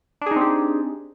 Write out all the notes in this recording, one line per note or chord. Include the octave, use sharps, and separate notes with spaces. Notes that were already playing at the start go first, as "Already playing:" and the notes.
C4 D4 D#4 G4 G#4